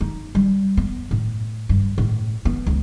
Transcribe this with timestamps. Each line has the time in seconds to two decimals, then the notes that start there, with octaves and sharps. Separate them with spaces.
0.01 D#4
0.35 G3
0.77 B3
1.11 A2
1.69 G2
1.98 A2
2.45 B3
2.66 C#2